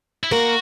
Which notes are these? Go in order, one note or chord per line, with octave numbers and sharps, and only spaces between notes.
E4
A#3 F#4 A#4